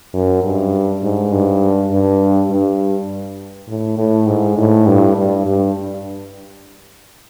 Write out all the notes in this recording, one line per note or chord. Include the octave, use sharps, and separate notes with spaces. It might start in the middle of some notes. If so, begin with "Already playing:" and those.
F#2
G2
G#2
G2
G2
G2
A2
A2
G#2
A2
G2
G2
G2